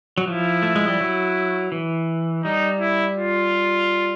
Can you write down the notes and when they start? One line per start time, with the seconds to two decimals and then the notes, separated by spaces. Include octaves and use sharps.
0.18 F#3
0.27 F3 E4
0.62 A3
0.76 G#3
0.88 G3
1.01 F#3
1.72 E3
2.44 G3 D#4
2.80 E4
3.16 F4